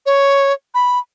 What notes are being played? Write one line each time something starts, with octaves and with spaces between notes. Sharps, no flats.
C#5
B5